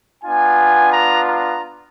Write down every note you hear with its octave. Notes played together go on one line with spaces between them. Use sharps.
B3 D4 F4 G#5
A#5
A#5